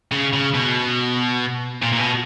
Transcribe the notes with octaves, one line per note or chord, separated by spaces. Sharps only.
C#3
C#3
B2
A#2
A#2
B2